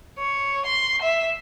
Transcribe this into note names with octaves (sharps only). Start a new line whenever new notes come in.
C#5
C6
E5